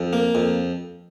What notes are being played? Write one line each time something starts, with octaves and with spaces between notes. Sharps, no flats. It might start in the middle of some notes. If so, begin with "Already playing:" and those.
Already playing: F2
A#3
F2